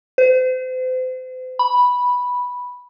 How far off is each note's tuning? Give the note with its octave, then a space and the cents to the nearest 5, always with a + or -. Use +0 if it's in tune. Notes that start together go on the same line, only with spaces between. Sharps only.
C5 -35
B5 -5